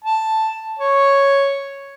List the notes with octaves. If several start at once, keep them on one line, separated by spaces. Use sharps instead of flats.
A5
C#5